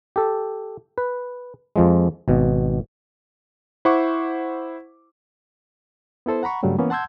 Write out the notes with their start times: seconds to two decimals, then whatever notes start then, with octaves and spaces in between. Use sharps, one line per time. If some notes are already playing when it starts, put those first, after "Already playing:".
0.16 G4 A4
0.98 B4
1.76 F2 F3 G#3
2.28 G#1 B2
3.85 E4 C5 F#5 C#6 D6
6.26 B3 E4 A4 C5
6.43 F#5 A#5 B5 C#6
6.63 G2 C#3 F#3 G3 A3
6.78 E3 A#3 B3 C#4
6.90 F#5 A5 C6 E6 G6 G#6